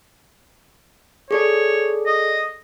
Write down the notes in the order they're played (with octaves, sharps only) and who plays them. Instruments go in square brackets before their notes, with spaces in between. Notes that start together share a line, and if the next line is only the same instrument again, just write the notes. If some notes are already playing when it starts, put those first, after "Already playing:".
[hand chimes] G#4 A4 D5 [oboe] C#5
[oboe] D#5